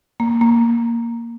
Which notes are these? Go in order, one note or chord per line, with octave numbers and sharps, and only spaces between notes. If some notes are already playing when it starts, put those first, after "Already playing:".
A#3
A#3